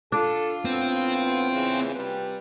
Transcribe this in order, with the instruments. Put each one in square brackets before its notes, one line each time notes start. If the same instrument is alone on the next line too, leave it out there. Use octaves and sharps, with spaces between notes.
[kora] D4 [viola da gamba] F4 [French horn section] A4
[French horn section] A2 E3 B3 [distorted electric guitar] C4
[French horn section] E2 C#3 E3
C3 G3 B4